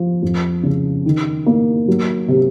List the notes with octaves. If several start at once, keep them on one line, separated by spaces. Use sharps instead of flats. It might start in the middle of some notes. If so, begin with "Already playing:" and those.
Already playing: F3
F2
C#3
D#3
A#3
F#3
C3